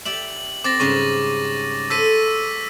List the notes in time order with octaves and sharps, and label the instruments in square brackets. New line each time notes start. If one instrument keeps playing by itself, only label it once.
[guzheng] G4 D5 E5 [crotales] F#7
[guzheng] C4 [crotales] D6 A6 A#6
[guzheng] G#2 C#3 G3 [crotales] C#6
[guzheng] A4 C5 [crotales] E6 B6 D#7